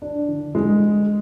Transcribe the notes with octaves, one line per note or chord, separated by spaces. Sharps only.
D4
D3
G#3